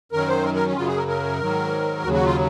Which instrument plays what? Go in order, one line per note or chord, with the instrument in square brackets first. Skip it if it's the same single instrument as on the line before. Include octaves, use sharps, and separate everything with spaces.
[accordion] F#2 D#3 F#3 A#4
C5
A#4
A#4
C#4
F#2 C#3 F#3 F4
G#4
A#4
A#4
G#2 D#3 F#3
D#2 C#3 F#3 F#4
F#4
F4